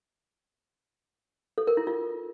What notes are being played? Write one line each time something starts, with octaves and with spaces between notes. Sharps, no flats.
A4
A#4
E4
F4